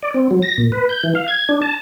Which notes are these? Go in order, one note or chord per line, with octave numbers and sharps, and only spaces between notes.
D5
C4
F#3
A#6
A#2
B4
G6
E3
F5
G#6
D4
A5